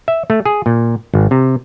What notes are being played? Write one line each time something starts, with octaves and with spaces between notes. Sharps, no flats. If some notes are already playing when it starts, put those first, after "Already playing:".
E5
A3
G#4
A#2
G#1
C3